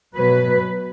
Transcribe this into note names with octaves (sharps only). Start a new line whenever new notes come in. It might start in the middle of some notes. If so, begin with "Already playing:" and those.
B2 F#3 B4